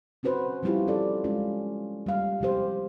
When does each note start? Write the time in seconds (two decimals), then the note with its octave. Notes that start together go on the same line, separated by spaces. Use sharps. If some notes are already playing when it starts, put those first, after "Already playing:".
0.23 C4 C#4 F#4 B4 C5
0.63 F3 G3 C4 E4 F4 G4
0.87 C#4 A4 D5
1.24 G#3 C#4 F4
2.06 G3 A#3 F5
2.40 C3 F3 G4 C5